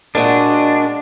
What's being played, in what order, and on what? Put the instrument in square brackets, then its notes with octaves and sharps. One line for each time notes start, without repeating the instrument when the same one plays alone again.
[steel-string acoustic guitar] A#2 G#3 F#4 [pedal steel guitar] D4